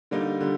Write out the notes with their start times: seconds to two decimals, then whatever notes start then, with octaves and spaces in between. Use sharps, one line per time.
0.11 D3 G3 A#3 D#4
0.41 D3 G3